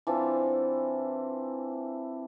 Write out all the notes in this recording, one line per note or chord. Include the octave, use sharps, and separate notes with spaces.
E3 C4 D4 F4